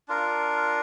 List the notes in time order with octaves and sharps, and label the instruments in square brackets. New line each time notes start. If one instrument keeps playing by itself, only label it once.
[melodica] D4 F4 A#4